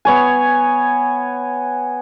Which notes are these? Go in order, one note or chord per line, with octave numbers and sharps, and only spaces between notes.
B3 C#5 G#5